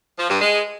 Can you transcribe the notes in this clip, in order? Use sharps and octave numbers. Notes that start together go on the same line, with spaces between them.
F3
G2
G#3